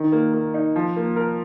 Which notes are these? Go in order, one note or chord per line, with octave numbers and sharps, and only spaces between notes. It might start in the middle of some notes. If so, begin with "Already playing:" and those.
Already playing: D#3
A#3
A#3
D#4
F3
A#3
A#4